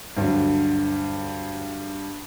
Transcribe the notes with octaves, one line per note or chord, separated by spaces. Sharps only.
D2 G2 D3 F#3